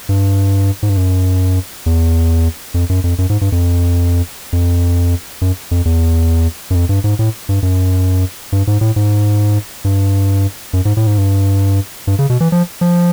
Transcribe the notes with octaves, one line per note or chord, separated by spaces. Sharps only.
G2
G#2
G2
F#2
E2
F2
F#2
F2
F#2
G#2
G2
F2
F2
F#2
F2
E2
F#2
F2
G2
G#2
A2
G2
F#2
G2
G#2
A2
G#2
G2
F#2
G#2
A2
G#2
G2
G2
C#3
B2
E3
F3
F3